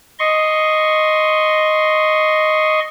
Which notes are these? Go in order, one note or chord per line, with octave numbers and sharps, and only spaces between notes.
D#5 C6 C#6